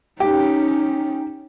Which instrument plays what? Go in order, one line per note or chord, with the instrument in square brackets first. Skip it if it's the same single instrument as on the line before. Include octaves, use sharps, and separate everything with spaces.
[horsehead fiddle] C#4 D#4 [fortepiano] G4